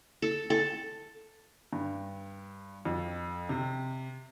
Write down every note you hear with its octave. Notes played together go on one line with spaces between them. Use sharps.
A4
A4
G2
F2
C3